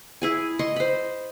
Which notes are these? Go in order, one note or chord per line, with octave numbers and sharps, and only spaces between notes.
E4 G#4 G#5
D#5 C6 C#6
C5 B5